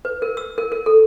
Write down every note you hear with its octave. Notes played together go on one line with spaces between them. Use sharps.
B4
A#4
E6
A#4
A#4
A4